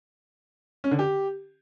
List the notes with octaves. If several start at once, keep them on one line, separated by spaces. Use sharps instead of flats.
C#4
D3
G4